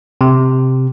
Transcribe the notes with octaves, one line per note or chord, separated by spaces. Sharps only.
C3